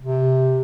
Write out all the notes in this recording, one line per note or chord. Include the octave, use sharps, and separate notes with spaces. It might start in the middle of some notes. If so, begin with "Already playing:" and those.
C3